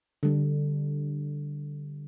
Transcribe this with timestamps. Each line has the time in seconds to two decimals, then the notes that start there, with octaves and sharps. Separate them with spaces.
0.23 D3 G3